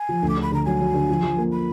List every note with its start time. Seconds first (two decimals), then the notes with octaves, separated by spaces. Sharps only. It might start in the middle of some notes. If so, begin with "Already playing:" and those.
Already playing: G#5
0.09 F3
0.22 D2
0.29 D6
0.37 D3
0.42 B5
0.52 D3 A#5
0.65 F#3 G#5
0.81 F#3
0.94 D3
1.09 F3
1.23 F3
1.37 A#3
1.52 B5